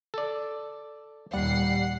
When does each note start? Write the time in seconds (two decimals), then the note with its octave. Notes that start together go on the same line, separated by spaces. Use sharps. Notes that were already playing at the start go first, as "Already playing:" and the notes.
0.14 A4 D5
1.33 D#2 A#2 G3 F#5 C7